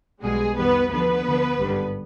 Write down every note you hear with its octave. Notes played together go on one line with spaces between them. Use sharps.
B1 B2 G3 G#3 G#4
F2 D#3 G3 B3 B4
D2 D3 F3 B3 B4
D2 D3 F3
G#1 G2 D3 G3